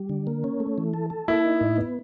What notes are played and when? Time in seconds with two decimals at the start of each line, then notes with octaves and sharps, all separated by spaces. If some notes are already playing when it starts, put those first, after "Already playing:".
Already playing: G3
0.09 D3
0.27 A#3
0.44 C#4
0.60 A3
0.78 E3
0.94 A4
1.10 A4
1.28 A#3 E4
1.45 D#4
1.61 A2
1.78 B3